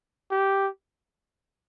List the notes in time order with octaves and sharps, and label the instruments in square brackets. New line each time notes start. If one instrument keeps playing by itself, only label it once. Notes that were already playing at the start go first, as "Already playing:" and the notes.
[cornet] G4